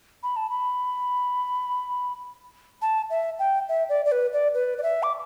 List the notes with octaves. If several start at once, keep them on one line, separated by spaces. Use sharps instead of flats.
B5
A5
B5
A5
E5
G5
E5
D5
D5
B4
D5
B4
D5
E5
D6